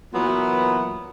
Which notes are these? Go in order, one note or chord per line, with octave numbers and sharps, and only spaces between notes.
A#2 E3 F#3 B3